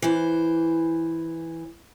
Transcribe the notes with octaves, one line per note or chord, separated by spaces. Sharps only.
E3 C5